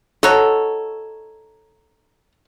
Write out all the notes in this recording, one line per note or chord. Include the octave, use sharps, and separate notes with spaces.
D#4 F#4 A4 C#5